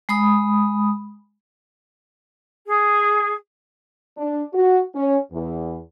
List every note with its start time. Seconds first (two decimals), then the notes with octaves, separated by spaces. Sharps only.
0.09 G#3 B5 D#6
2.66 G#4
4.17 D4
4.54 F#4
4.94 C#4
5.32 E2